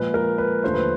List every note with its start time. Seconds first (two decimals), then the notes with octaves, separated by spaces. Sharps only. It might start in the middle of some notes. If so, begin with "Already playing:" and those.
Already playing: A#2 F3 G#3 B4
0.14 A#4
0.38 B4
0.63 D#2 D3 F3 A3 C5
0.74 B4